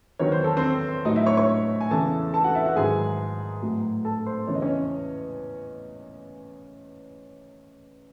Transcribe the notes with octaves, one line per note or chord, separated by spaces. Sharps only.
E2 D#3 F#3 C#5
C5
A4
C4 C5
A2 F#3 D#4 D#5
E4 E5
C#5 C#6
C#5 C#6
G#5
E2 C#3 E3 A4 A5
A4 A5
F#4 F#5
E4 E5
F#4 F#5
G#2 D#3 F#3 G#4 G#5
A2 F#3
A4 A5
C5 C6
E2 C#3 E3 C#5
D#5
C#4 C#5